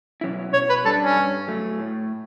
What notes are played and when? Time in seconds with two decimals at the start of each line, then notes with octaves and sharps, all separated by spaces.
0.21 B2 F#3 C#4 E4
0.53 B2 C#5
0.69 B4
0.84 G3 D4 A4
1.01 C#4
1.16 G2
1.48 F#3 A3
1.80 A2